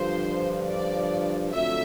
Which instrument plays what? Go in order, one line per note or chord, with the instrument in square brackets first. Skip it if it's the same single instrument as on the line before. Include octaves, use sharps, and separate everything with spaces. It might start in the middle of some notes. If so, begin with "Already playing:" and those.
Already playing: [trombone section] G2 D3 F3 [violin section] C5
[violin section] D5
[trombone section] F2 D3 F#3 A3 [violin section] E5